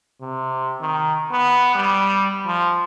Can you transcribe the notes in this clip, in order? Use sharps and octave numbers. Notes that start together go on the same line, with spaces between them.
C3
D#3
B3
G3
F3